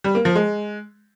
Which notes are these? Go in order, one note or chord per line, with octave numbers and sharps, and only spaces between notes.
G3
A#3
F3
G#3